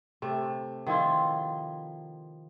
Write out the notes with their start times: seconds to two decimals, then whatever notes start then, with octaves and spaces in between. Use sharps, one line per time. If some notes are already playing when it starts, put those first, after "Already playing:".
0.22 C3 A3
0.87 D#3 F3 E4 F4